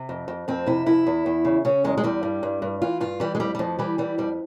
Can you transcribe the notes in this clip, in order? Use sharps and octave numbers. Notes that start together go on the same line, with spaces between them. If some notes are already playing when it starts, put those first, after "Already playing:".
Already playing: C3
F2
F2
F2 C4
C3 E4
F2 E4
E2
E2
C#3
C#3 C#4
E2 G#3
G#3
E2 G3
G2
G2
G2
E3 F4
G2 F4
E3 G3
G#3
F2 G3
G3
F2 F3
E3 G3
E3 G3
F2 G3